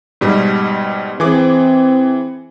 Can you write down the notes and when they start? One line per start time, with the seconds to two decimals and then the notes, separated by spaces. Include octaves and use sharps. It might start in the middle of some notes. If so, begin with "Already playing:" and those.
0.21 G#2 B2 G3
1.20 E3 C4 G#4 D6